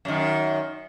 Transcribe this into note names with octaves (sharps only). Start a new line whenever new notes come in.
F#2 D#3